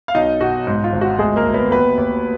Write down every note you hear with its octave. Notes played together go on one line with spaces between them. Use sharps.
F5
B1 D#4 D#5
B2 F#4
G#2
F4
G#1
F#4
D2 G#3 G#4
A#3 A#4
D2
B3 B4
D#2 B3 B4
D#2